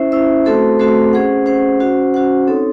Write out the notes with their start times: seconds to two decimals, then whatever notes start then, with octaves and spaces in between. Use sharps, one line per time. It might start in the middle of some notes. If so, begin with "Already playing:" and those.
Already playing: C#4 E4 C5 E5
0.12 C#4 E4 C5 E5
0.45 A3 C4 F#4 A4 C5
0.79 A3 C4 F#4 A4 C5
1.13 C#4 G#4 C5 F#5
1.46 C#4 G#4 C5 F#5
1.80 C#4 F#4 C5 F#5
2.14 C#4 F#4 C5 F#5
2.47 C4 D#4 A4 C#5